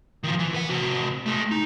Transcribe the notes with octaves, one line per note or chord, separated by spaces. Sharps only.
D#3 F3
E3
B4 F#5
C3 F#4
A3 G#4
D#4